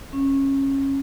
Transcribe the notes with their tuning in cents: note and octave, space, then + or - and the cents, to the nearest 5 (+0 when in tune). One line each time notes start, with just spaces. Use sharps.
C#4 -20